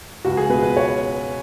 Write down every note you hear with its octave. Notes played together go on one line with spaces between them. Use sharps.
C#2 F#4
G#4
B2 B4
B4
C#5